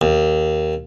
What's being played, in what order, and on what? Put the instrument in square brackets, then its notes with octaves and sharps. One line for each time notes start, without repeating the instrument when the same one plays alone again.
[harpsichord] D#2